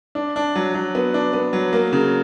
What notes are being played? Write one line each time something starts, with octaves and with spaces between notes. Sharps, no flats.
D4
D4
F#3
F#3
B3
D4
B3
F#3
A#3
C#3